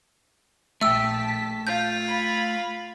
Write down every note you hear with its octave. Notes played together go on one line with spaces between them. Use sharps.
A#1 A3 E5 G5 A5 E6 B6
F4 G6
B5 G#6